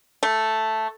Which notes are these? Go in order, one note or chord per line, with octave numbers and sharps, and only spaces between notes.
A3